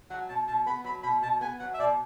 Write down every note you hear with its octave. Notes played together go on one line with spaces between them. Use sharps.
F#3 F#5
B2 A5
B2 A5
B3 B5
F#3 B5
B2 B5
B2 A5
B3 G#5
F#3 F#5
E5
B2 D5